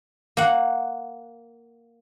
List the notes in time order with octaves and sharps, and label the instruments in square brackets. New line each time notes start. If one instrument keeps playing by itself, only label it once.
[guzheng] A#3 F#5